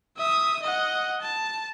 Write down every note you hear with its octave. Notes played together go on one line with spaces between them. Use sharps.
E5 D#6
D#5 F#5
A5